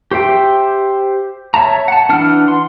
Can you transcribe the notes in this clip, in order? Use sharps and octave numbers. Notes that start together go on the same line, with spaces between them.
G4 C5 E5 G5
C#5 E5 A5 A#5
F#5 A5
E3 D4 F#5 F6
C6